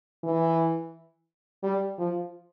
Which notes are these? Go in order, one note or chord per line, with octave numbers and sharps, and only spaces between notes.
E3
G3
F3